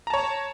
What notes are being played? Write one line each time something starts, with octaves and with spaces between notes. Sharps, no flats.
C#5 A5 A#5